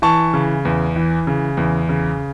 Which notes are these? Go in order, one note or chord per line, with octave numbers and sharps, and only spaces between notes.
E3 A5 C#6
C#3
E2
E3
C#3
E2
C#3